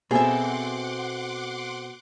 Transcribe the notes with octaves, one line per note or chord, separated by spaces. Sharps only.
B2 C4 G#4 A4 E5 F#5 C6 D6